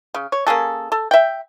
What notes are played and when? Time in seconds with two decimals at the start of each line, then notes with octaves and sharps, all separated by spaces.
0.14 C#3
0.32 C#5
0.47 A#3 C#4 G#4 A4
0.92 A4
1.11 E5 G5